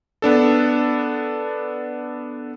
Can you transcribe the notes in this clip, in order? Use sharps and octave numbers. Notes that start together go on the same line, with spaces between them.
B3 D4 A4